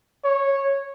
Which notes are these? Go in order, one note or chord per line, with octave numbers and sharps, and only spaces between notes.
C#5